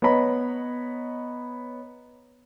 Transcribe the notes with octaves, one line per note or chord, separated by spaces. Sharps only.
B3 C#5 D#5 A#5 B5